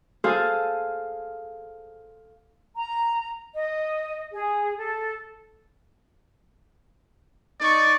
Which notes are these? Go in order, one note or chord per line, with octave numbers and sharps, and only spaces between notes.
G#4 A4 C5 F5 G#5 A5
A#5
D#5
G#4
A4
D#4 D5 C#6